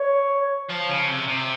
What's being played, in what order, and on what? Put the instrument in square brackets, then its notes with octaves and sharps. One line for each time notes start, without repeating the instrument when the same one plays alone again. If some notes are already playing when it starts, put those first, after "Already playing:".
Already playing: [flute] C#5
[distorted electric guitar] F3
C#3
C3
C3